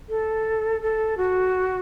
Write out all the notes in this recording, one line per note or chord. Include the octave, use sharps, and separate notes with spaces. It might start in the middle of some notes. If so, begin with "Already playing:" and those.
A4
A4
F#4